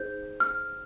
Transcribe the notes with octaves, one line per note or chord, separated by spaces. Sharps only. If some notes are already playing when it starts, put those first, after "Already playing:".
Already playing: D#4 G#4 C5 G6
F6